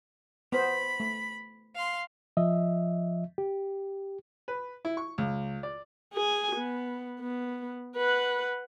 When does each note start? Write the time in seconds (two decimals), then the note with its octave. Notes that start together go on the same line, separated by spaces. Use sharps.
0.52 B3 C5 B5
1.00 A3
1.75 F5 C6
2.37 F3 D#5 E5
3.38 G4
4.48 B4
4.85 E4
4.97 C#6
5.18 C#2
5.63 D5
6.13 G#4 G#5
6.56 B3
7.20 B3
7.96 B4 F#5